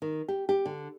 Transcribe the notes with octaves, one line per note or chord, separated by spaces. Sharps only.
D#3
G4
G4
D3